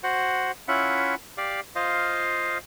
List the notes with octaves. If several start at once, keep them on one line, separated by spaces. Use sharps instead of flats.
F#4 C5 F#5
C#4 E4 F4 E5 F#5
G4 D5 F5
F4 C5 D#5 F5